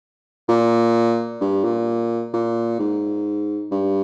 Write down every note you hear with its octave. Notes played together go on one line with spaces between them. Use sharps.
A#2
G2
A#2
A#2
G#2
G2